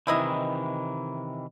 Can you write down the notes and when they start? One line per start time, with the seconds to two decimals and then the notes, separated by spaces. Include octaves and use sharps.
0.07 C3 D#3 E3 D#4 E4 D#5